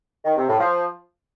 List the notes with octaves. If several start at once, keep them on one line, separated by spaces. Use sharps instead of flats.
D#3
C3
A2
F3